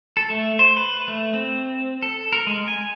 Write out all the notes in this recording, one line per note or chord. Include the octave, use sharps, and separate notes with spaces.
A4
A3
C5
B4
A3
C4
A4
A#4
G#3
G#5